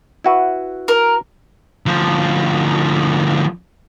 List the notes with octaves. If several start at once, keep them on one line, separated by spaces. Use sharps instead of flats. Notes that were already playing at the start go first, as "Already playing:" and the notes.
E4 F#4 B4
A#4
D2 F3